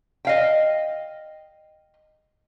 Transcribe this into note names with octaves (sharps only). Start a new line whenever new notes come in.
D#5 F5 G5